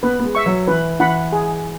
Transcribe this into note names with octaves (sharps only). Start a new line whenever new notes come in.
B3 B4
B3
G#3
E5 C#6
F#3
E3 B4
E3 F#5 B5
G#4